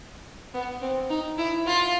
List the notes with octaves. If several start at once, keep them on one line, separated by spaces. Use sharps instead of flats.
B3
C4
D#4
E4
F4